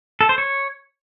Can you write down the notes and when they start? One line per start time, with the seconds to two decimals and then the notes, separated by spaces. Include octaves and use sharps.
0.21 A4
0.29 C5
0.38 C#5